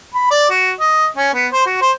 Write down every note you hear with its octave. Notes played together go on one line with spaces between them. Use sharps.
B5
D5
F#4
D#5
C#4
B3
C5
F#4
C5